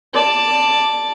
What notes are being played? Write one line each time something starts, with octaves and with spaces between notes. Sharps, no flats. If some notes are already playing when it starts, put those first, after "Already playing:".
D5 A5